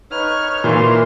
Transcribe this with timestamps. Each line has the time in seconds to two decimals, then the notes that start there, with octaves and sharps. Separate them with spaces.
0.11 D#4 B4 C#5 C#6 F6
0.64 A#2 E3 A#4 C6